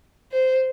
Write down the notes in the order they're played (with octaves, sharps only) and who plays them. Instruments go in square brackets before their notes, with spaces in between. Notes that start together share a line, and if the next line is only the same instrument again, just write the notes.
[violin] C5